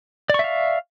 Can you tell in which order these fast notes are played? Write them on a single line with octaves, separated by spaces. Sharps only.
D5 C#6 E5 F5